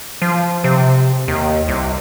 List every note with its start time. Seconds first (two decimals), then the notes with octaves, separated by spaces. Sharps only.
0.22 F3
0.64 C3
1.28 D#2
1.68 C2